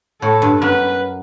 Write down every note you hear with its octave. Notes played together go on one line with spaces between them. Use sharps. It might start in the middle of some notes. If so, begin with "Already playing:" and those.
A2 A4
G2
F#2 B4